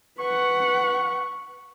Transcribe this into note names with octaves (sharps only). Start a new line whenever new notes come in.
B4 F#5 C#6